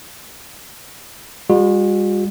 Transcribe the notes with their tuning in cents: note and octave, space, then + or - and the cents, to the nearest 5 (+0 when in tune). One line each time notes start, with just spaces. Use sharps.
G3 +45 F#4 -40